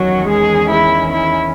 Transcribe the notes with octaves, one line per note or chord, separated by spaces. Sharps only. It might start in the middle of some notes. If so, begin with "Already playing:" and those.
Already playing: E2 D#3 F#3 C#4 F#4
G#3 G#4
E4
E4